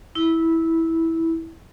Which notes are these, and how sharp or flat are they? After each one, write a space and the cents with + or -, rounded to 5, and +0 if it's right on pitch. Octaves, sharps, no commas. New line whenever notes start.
E4 -10